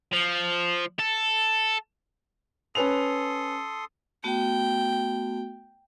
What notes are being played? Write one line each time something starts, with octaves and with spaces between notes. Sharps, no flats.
F3
A4
C#4 A4 B4 C6 D#6 F7
A3 B3 F#4 G5